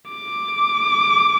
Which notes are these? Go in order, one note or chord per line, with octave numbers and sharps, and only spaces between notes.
D6